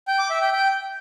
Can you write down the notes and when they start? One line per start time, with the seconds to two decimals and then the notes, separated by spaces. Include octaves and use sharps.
0.08 G5
0.19 D6
0.30 E5
0.41 G5
0.52 G5